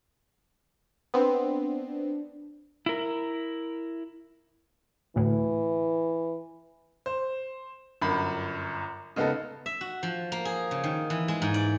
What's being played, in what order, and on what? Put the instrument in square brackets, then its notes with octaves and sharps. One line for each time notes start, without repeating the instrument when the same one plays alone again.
[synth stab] B3 C4 [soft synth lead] D4
[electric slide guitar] E4 A#4
[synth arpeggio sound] D2 A2 [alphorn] E3
[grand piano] C5
G1 F#2 B5
C#3 G#3 B3 D#4 A4
[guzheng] E5
F#4
F3
A#3
G#4
C#3
D#3
E3
G#3
G#2
D5